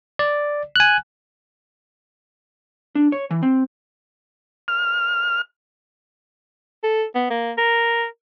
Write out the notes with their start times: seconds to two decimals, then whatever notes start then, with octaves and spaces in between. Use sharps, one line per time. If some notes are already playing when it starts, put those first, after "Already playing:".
0.19 D5
0.76 G#5 F#6
2.95 D4
3.12 C#5
3.31 E3
3.43 C4
4.68 F6
6.83 A4
7.15 B3
7.30 A#3
7.58 A#4